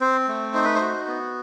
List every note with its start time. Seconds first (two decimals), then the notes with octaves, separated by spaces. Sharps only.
0.01 C4 C5
0.28 A3
0.54 D#4 C5
0.64 B4
0.75 C5
0.80 F#4
1.07 B3